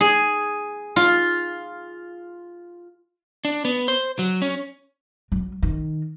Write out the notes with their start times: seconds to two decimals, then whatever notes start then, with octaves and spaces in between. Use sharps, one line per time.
0.01 G#4
0.96 F4
3.45 D4
3.65 B3
3.88 C5
4.19 F#3
4.42 C#4
5.32 F#3
5.63 D#3